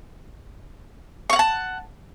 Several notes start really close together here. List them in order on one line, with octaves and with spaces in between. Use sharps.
C#6 F5 F#5 A5